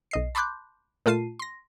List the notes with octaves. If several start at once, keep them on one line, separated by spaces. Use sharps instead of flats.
B1 D#5 C7
A5 B5 C6 D6 F#6 G6
A#2 A3 F4 A5 C7 D#7
C6 A#6